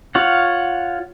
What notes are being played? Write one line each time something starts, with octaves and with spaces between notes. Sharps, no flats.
F4 C#5 F#5